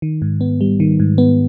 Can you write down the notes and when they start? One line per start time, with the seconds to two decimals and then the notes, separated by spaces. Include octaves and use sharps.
0.02 D#3
0.22 G#2
0.41 B3
0.61 G3
0.80 D#3
1.00 G#2
1.18 B3